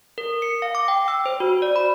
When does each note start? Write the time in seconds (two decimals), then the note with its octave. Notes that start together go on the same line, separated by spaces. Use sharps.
0.18 A#4
0.42 C#7
0.62 F5
0.75 D6
0.88 G5
1.08 E6
1.26 C5
1.40 F#4
1.62 D5
1.76 B5